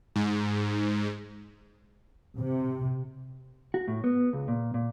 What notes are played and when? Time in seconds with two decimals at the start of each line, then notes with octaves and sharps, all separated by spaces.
0.16 G#2
2.39 C3
3.74 F#4
3.88 A2
4.04 B3
4.33 C#2
4.48 A#2
4.74 A#2